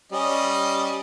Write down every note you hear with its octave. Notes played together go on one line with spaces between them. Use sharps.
G3 C#4 D#5